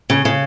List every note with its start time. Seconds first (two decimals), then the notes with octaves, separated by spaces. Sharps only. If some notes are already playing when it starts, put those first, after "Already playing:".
0.10 C#3
0.25 C#3